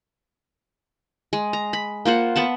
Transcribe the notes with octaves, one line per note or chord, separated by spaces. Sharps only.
G#3
A#5
B5
A#3 F4 C5 F#5
B3 F#5 A5